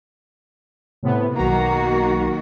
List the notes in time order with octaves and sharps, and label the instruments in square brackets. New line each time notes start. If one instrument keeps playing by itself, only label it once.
[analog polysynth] A2 C3 B3
[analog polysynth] B1 A#5 [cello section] D#3 A#3 F#4